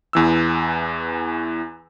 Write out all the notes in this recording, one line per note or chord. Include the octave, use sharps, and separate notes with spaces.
E2 E3 E6